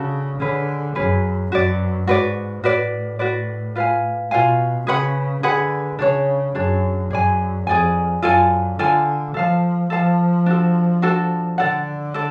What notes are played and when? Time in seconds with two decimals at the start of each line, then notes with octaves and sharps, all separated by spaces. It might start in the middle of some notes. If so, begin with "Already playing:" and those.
Already playing: C#3 D4 F#4 A4
0.39 D3 C#4 G#4 B4
0.95 F#2 C#4 G#4 B4
1.52 F#2 F#4 B4 D5
2.07 G#2 F#4 B4 D5
2.64 A2 F#4 B4 D5
3.19 F#4 B4 D5
3.76 F4 B4 F5 G#5
4.31 B2 F4 B4 F5 G#5
4.87 C#3 G#4 B4 F#5 B5
5.42 D3 G#4 B4 F#5 B5
5.99 C#3 D4 G#4 C#5
6.55 F#2 D4 G#4 C#5
7.11 F#2 G#4 D5 G#5
7.67 F2 G#4 D5 G#5
8.22 F#2 F4 A4 D5 G#5
8.78 D3 F4 A4 D5 G#5
9.34 F3 A4 F5 A5
9.90 F3 A4 F5 A5
10.46 D4 F#4 A4
11.02 D4 F#4 A4
11.58 D3 A4 D5 F#5
12.14 A4 D5